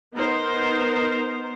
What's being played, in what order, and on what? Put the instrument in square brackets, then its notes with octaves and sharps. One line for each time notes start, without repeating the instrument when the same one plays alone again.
[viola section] B3 D#4 A#4 C5